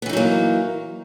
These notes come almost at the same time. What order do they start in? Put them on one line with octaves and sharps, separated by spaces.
B3 E3 D#4 F#3 A#3